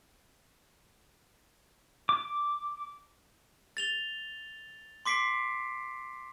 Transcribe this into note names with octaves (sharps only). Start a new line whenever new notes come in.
D6
A6 F7 G7
C6 D6 B6 C7 D7